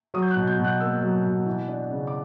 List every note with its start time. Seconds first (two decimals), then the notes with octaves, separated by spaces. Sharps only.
0.14 F#3 D#6
0.23 G6
0.31 F#6
0.36 B2
0.47 G6
0.58 B2
0.64 F#6
0.80 A#3 E6
1.03 F#3
1.25 B2
1.46 E3
1.68 D4
1.90 C#3
2.07 D6